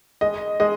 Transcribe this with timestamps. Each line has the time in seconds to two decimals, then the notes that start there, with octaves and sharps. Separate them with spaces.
0.21 G#3 D#5
0.60 G#3 D#5